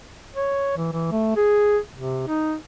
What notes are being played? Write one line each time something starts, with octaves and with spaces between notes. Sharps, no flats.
C#5
E3
E3
A3
G#4
C3
D#4